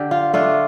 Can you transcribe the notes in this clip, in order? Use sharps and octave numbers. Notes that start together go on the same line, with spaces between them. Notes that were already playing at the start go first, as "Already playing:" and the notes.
Already playing: D3 D4 G4
F4
A3 D4 F4